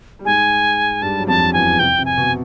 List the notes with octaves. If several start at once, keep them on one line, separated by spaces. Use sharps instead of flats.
G3
G#2 G#3 G#5
G2 G3 A5
F#3
F2 F3 A5
E2 E3 G#5
C3 G5
C3
G#5
B2